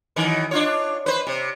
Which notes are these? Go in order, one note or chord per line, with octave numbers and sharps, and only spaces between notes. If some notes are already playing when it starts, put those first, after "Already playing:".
F#2 D#3 E3
D4 F4 C#5
B4 C5
C3